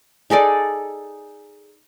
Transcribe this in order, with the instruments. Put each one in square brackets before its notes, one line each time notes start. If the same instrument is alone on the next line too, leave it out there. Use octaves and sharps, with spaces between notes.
[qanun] D#4 G#4 A4 D5